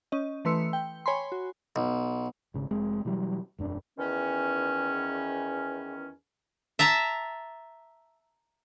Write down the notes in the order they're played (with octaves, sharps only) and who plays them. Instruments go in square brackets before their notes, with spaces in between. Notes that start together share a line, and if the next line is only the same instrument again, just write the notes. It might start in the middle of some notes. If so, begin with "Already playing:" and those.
[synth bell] C#4 D#5
E3 A3 B4 C6 E6 C#7
G5
C#5 G#5 B5 C6
F#4
[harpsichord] B1
[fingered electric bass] G#1 C#3
F1 G#3 C4
B2 E3 F#3 G3
E1 F#2 D4
[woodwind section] E2 D#3 C#4
[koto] E5 A5 A#5